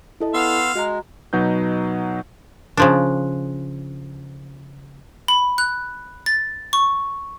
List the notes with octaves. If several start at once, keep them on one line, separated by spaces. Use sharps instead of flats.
E4 A4 D#5
B3 F5 C6 E6
G#3 F#4 A#5
B2 F#3 D#4 B4 G6
C#3 F3 D4
B5
F#6
A6
C#6